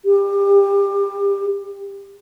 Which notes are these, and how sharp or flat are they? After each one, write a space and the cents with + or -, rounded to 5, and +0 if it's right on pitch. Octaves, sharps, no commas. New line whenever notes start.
G4 +25